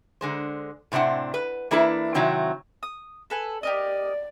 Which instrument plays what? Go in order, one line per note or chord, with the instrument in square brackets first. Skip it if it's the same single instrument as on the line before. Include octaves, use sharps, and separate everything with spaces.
[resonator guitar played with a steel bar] D3 G#3 C5
A2 C3 C4 D4 F#5
B4
E3 A#3 D4 E4 A4 B4
C3 D#3 F#3 C4 E4
[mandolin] D#6
A4 B4 G#5
[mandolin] G4 A#4 D#5 [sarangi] D5